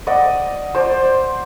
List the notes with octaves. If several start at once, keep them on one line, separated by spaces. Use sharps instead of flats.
D5 D#5 F#5
C5 D5